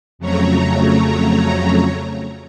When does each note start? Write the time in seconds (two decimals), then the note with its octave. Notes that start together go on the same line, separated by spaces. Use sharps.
0.19 F2 C#3 F#3 A3 C#5 A#5